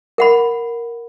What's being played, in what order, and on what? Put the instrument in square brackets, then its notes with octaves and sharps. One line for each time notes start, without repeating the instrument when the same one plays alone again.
[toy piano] A#4 F#5 B5